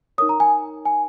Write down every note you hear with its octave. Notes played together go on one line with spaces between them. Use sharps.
D#4 A#4 C#5 D#6
A#5
G#5
G#5